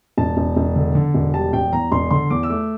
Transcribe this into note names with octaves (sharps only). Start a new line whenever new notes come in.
E1 A5
E1
E1
D3
D3
E1
G3 A5
E1 G5
E2 A#5
E1 C6
D3 C6
E2 D6
E6
A3 D6